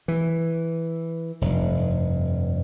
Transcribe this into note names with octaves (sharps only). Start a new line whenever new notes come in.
E3
F1 G2